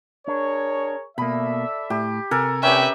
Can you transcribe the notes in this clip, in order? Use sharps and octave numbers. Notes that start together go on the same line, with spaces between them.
D4 G#4 A#4 C#5
B2 A#3 A4 D5 E5 B5
A2 G4
C3 A4 A#4 G#5
C#4 G4 B4 D5 E5 G5